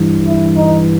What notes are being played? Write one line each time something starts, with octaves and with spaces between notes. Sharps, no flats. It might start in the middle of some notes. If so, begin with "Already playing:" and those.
Already playing: G2 E3
E4
D#4